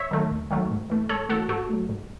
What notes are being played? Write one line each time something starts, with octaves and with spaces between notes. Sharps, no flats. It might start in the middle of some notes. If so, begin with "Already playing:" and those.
Already playing: C#5 E5
D#3 F#3 A3
D#2
D#3 F#3 A3
G#2
E3 A3
G#2 A4 C#5
E3 A3 F#4 A4
G#2 F#4 A4
F#3 A3
G#2